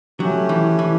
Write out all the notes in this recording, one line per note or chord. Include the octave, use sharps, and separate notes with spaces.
F#3 A3 C#4 G4
E3
E3